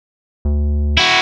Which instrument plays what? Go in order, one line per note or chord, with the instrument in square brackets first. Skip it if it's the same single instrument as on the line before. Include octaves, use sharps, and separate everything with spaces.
[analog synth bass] D2
[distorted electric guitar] E4 F#4